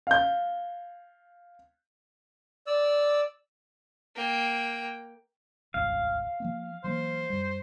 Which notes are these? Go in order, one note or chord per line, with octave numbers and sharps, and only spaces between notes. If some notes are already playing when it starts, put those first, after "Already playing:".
F5 G6
D5 E6
A#3 G5
D#1 G#1 C#2 F5
F3 A#3 B3
E3 F#3 A#3 C5
F#2 G3